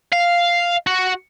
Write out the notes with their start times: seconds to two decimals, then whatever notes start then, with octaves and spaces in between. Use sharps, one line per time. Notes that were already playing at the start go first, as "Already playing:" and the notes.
0.12 F5
0.87 F#4